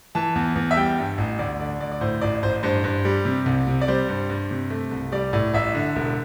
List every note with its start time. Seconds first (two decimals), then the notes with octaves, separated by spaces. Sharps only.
0.15 E3 A5
0.35 E2
0.56 E2
0.71 E5
0.77 G3 G5
0.98 G2
1.18 A1
1.39 D2 D5
1.60 D3 D5
1.80 D2 D5
1.92 D5
2.01 A2 C5
2.21 A1 D5
2.43 A1 C5
2.63 G2 C5
2.84 G2
3.05 G3
3.25 C3
3.46 C2
3.67 C3
3.81 D5
3.88 G3 C5
4.08 G2
4.30 G2
4.51 C3
4.70 A3
4.91 C2
5.12 G3 D5
5.33 A2 D5
5.54 A1 E5
5.74 D3
5.96 E1